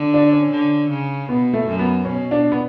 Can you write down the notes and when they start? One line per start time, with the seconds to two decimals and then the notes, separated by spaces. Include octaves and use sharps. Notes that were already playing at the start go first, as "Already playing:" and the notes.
Already playing: D3
0.14 D4
0.32 C#4
0.51 D3
0.90 C#3
1.29 B2 B3
1.54 A3
1.67 F#2
1.79 B3
2.05 B2 C#4
2.31 D4
2.52 B3